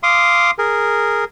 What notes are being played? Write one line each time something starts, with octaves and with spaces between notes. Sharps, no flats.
F5 C6 D6 D#6
G#4 A#4